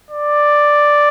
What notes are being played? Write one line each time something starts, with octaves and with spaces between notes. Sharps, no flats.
D5